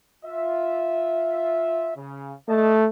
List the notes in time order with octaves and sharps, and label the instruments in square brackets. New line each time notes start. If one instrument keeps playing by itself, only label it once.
[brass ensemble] F4 E5
C#3
[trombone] A3 [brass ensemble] D#5 A5